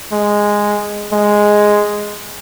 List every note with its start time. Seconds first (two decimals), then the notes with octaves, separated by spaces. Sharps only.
0.13 G#3
1.13 G#3